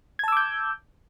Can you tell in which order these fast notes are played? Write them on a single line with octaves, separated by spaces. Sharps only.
G#6 A5 E6 D6 G6